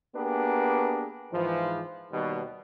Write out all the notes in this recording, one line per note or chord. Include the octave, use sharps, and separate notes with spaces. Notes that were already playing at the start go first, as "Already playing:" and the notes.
A#3 B3 D4 G4 G#4 B4
G#2 E3 F3
D#2 B2 G3